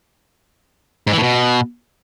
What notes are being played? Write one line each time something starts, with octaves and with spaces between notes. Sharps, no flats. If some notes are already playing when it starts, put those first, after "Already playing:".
G#2
E3
A2
B2